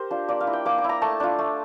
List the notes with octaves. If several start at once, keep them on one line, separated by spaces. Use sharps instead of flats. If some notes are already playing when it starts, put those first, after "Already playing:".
Already playing: G4 A#4 C5
D4 F4
A#3 D5
F5
E4
G5
A#3 D6
D6
E4 A#5
A3 A5
D4 F4
A3